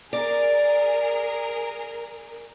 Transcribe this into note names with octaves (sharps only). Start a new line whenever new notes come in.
G#4 A#4 D5